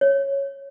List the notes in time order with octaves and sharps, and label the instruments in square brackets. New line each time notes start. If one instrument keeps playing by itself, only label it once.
[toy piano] C#5